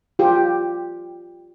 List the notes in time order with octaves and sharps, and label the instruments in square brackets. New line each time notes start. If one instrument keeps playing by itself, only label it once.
[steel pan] F4 G4